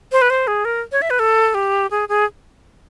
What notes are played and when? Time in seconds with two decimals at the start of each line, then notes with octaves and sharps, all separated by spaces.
0.12 C5
0.22 B4
0.30 C5
0.47 G#4
0.65 A#4
0.92 C#5
1.02 E5
1.10 B4
1.19 A4
1.54 G4
1.91 G#4
2.09 G#4